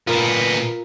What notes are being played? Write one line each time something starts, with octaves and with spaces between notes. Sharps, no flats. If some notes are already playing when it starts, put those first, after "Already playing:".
A#2 B3 F4 A#4